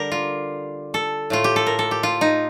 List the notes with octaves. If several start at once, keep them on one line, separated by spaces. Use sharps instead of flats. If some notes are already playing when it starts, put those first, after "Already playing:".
Already playing: D3 G3 G4 A#4
F4
A4
A2 A3 F4
G4
A4
A#4
A4
G4
F4
D#4